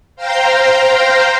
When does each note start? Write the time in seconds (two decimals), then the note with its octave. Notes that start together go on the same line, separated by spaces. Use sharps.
0.16 C5 F5 G5 A#5 C6